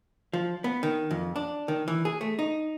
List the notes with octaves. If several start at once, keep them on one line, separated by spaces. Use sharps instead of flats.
F3
B3
D#3
F2
D4
D#3
E3
G#4
A3
D#4